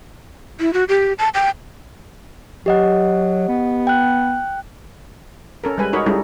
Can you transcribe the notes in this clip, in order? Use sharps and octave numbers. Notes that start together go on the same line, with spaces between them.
E4
F#4
G4
A5
G5
F#3 G4 D#5 F#5
B3
G5 F#6
C#4 A4 A#4
G3 G#3 B4 G#5
D#4 F#4 A#4 C#5 D#5 B5
G3 G#3 C#4 D#4 E4 A4